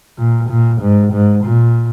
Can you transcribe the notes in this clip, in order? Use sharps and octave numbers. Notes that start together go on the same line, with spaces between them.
A#2
A#2
G#2
G#2
A#2